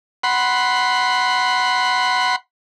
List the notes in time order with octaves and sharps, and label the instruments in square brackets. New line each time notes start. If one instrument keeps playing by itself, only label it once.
[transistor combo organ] F#5 B5 C6